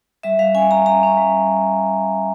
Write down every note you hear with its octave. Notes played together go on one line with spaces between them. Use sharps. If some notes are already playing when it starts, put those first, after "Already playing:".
G3 E5
G3 F5
C#4 G#5
C#4 A#5
C#4 A#5
C#4
G3